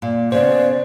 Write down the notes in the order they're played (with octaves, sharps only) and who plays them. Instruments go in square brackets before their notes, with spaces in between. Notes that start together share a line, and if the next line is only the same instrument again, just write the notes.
[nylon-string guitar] A#2
[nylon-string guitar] C#3 B3 [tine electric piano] C5 [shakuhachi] D5